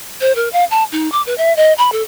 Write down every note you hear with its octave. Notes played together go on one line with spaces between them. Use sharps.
C5
A#4
F5
A5
D#4
D6
B4
E5
D#5
B5
A4